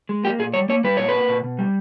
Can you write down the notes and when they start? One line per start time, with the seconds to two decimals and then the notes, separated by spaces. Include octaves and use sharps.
0.09 G#3
0.24 A#3 G4
0.39 A#2 G#4
0.54 G3 C#5
0.69 A#3 C#5
0.84 G3 B4
0.97 A#2 C#5
1.09 B4
1.14 A#3
1.28 A#2
1.44 B2
1.59 G3